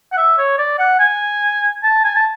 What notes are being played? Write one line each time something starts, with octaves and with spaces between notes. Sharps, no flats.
F#5
E5
C#5
D5
F#5
G#5
A5
G#5
A5